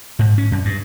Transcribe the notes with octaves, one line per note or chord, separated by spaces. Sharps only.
G#2
C#4
F#2
G2